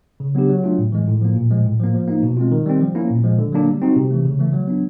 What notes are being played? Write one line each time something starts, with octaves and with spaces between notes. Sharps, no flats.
C#3
F#3 B3 D4 G4
F#3
A3 D4 F4
A2
E3 G#3
A2
F3 A#3
A#2
F3 G#3
A2
F3 A#3
F3
A#3 D#4
B2
G#3 C4 F4
D#3
G3 C4
F3
A#3 C#4 E4
A#2
F3 G#3
D3
F#3 A#3 D4
G3
C4 D#4 F#4
C3
E3 A3
C#3
E3 A3
F#3
B3 D4